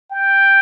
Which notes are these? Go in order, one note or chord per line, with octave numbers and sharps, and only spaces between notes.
G5